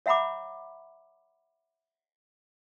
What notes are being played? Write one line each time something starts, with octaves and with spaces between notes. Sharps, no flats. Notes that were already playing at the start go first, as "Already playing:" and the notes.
C#5 E5 F#5 A#5 B5 D6